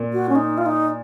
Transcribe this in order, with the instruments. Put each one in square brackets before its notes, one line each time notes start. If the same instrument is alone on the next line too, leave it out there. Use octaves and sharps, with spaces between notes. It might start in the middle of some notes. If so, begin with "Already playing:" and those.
Already playing: [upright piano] A#2
[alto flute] F#4
C#4
D#4
F4
D#4